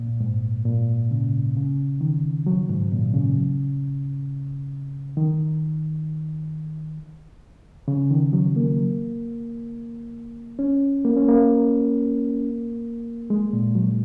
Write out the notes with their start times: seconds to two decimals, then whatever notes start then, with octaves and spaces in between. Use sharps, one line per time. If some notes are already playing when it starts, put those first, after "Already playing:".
Already playing: A#2
0.20 G#2
0.65 A#2
1.11 C#3
1.56 C#3
2.01 D#3
2.47 F#3
2.69 G#2
2.92 A#2
3.14 C#3
5.17 D#3
7.88 C#3
8.11 D#3
8.33 F#3
8.56 A#3
10.59 C#4
11.05 A#3
11.17 C#4
11.28 A#3
13.30 G#3
13.53 A#2
13.75 F#3